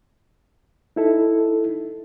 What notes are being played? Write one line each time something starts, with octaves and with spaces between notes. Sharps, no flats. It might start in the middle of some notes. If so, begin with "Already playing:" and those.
D#4 E4 A4